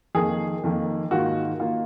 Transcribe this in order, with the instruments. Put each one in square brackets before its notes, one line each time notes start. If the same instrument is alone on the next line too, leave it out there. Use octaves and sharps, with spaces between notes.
[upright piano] F2 D#3 A#3 G#4
F2 D#3 A#3
G#2 D#3 A#3 F4 F#4
D#3 A#3 F4